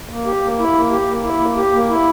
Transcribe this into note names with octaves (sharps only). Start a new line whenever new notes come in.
A#3
G4
A#3
E4
A#3
G4
A#3
E4
A#3
G4
A#3
E4